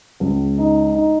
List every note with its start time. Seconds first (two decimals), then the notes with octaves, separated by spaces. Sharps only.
0.20 C#2
0.58 D#4
0.94 D#4